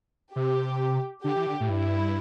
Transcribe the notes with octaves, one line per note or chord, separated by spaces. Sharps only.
C3 G4
D3 G4
E3
D3
A2
G2 E4